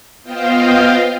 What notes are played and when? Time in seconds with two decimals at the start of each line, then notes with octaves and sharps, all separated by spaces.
0.23 B3 F4 C5 D#5 F5 G5